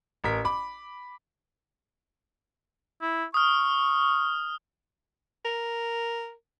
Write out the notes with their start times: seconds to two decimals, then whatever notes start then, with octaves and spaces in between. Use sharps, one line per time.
0.24 A1 A#4 B6
0.45 B5 D6
3.02 E4
3.34 C#6 D#6 F6
5.45 A#4